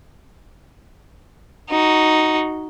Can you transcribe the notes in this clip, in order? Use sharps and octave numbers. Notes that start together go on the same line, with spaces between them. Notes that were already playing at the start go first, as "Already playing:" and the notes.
D#4 F#4